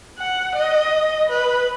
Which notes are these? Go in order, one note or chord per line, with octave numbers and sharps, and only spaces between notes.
F#5
D#5
B4